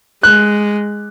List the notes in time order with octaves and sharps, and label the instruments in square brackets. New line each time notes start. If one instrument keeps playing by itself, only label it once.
[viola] G#3 [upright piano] F#6